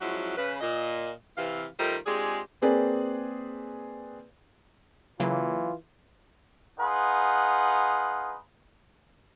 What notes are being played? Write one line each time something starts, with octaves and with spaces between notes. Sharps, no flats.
F3 F#3 G#3 C#4 E4 F#4
C#3 B4
A#2 D#5
C3 E3 F5
D#3 G3 A3 D#4 F4 C5
G#3 C4 D4 F4 G4 G#4
A#3 C4 G#4 B4 D5
C#3 E3 F#3 A#3 F4
D#4 G#4 B4 F5 F#5 C6